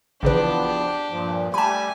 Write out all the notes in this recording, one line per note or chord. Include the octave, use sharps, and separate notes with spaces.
A1 E2 C#3 F3 B3 D4 G4 B4
G2 A#2 F3
G3 A3 G4 G#5 A5 B5